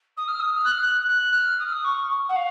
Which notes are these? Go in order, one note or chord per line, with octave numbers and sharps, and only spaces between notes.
D#6
F6
D#6
F6
F#6
F6
F#6
F#6
F6
D#6
F6
D#6
C#6
F#5
F5